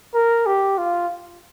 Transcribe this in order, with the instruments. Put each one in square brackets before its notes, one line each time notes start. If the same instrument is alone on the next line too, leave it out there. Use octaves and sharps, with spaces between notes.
[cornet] A#4
G4
F4